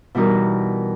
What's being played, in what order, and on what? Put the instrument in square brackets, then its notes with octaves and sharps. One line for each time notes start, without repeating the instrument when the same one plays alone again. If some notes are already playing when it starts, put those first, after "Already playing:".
[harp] B2 E3 G3 D#4 A#4